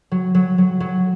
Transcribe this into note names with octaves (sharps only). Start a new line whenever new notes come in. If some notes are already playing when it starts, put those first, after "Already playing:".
F#3
F#3
F#3
F#3